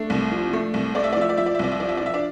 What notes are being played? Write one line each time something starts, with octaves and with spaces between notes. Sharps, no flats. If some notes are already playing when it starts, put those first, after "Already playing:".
Already playing: A3 D4
C2
F3
A3
C2
A3 D5
E5
D5
F3 E5
D5
F3 E5
D5
E5
C2 D5
E5
F3 D5
E5
D5
F3 E5
D4 D5